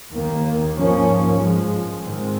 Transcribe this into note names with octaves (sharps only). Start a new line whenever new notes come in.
D#2 D#3 A#3
G#2 F3 A#3 C#4
G2 F3 G#3
G#2 D#3 G#3 C4